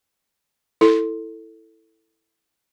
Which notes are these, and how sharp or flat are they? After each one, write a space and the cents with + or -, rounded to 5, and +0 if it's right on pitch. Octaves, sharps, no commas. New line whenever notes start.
E4 +0 A4 +10